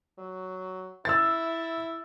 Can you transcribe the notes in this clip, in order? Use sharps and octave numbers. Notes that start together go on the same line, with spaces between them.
F#3
E4 E6 A6